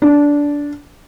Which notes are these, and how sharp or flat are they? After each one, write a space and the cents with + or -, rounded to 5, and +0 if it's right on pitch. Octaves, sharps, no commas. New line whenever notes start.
D4 -15